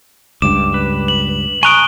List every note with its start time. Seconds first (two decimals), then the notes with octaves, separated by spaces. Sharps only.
0.42 C#2 G2 D6 E7
0.74 B4
1.08 F#7
1.63 G#5 A#5 C#6 D#6 F#6 D7 G7